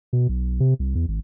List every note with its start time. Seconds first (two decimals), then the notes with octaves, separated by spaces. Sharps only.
0.13 B2
0.29 B1
0.60 C3
0.79 C2
0.95 E2
1.08 G#1